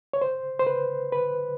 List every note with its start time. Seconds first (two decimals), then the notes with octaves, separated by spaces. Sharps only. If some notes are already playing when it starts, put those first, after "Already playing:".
0.13 C#5
0.22 C5
0.59 C5
0.67 B4
1.12 B4